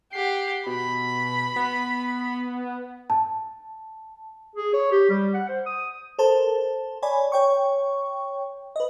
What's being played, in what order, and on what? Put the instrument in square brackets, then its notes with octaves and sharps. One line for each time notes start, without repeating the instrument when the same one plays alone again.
[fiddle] G4 F#5 [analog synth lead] C7
[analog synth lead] B2 [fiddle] B5
[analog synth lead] B3
[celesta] A5
[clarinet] G#4
C#5
G4
G3
F#5
C5
D#6
[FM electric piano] A4 A#4 C5 A5
C#5 D5 G#5 B5
C#5 G5 C#6
B4 D#5